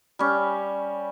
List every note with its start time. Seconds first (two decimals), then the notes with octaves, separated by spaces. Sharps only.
0.19 G3 C#4